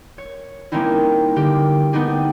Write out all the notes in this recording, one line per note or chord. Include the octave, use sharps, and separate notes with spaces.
C#5
G3 A#3 C4 C#4 D#4 E4
D3 A#3 G4
A3 B3 D#4 G4 G#4